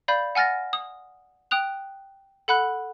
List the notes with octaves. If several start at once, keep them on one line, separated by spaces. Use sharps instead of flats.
D5 F5 B5 G6
F#5 G#5 F6 A6 A#6
D#6
G5 D#6 F#6 F7
A4 F#5 B5 F#6